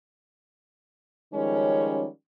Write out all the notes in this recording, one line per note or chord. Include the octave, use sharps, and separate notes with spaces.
D#3 F3 G3 G#3 C#4